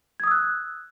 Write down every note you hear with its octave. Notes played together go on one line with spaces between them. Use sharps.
D#6 E6 F#6 G#6